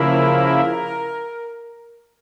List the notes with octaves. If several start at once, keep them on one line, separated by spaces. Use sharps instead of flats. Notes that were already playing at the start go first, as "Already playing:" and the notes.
Already playing: C#3 F3 A#3 E4 A#4